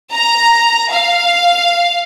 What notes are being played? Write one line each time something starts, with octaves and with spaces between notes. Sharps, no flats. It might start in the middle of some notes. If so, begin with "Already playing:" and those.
A#5
F5